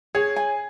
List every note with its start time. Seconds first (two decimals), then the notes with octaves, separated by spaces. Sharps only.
0.15 G#4 C#5
0.36 G#5